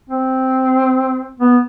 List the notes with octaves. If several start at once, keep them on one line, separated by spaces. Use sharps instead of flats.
C4
B3